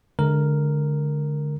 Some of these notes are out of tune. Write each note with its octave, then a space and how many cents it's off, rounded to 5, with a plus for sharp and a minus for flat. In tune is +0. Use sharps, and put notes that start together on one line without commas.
D3 +0 G#3 +35 A#4 +0